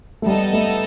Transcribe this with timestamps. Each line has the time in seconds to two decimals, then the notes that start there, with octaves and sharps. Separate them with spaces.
0.22 A3
0.26 G3 B3 D#4 A4 D#5 A5
0.53 A3